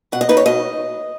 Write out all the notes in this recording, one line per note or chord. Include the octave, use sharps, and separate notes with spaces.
B2 F#5
D#5
B3 D#4 B4
C#5
B2 D#5